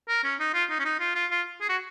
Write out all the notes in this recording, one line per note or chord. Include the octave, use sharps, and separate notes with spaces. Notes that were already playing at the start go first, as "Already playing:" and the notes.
A#4
C#4
D#4
F4
D#4
C#4
D#4
F4
F4
F4
G#4
F#4